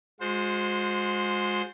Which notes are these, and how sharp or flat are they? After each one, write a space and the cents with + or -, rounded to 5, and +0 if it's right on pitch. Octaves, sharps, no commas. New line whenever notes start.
G#3 +0 F#4 -45 C5 +0